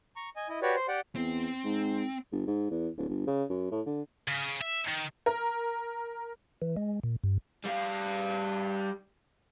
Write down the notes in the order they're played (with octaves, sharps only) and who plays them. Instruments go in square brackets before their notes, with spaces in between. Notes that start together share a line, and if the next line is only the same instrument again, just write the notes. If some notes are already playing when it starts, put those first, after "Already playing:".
[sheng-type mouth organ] A#5 C#6
D#5 G#5
E4 D#5
F#4 G4 B4 C#5 D5
C5 C6
G4 D5 F#5 G5
[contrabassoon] E2 [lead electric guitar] C4
[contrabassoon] G#2
G1
G#2
E2
D1
G1
C#3
F#2
A2
D3
[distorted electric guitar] C#3
E5
D#3
[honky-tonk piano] A#4
[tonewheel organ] E3
G#3
A#2
G2
[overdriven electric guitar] G3 F5